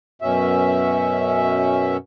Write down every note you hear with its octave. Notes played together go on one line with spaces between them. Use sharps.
F#2 B2 C#4 E5